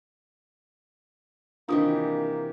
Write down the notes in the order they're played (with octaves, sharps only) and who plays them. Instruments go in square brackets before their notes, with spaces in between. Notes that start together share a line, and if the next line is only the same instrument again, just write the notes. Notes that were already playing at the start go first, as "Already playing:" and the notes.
[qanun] C3 D#3 E3 [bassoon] A#3 [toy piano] D4 F4 D#6